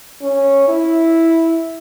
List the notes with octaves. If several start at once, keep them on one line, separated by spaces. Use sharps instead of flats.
C#4
E4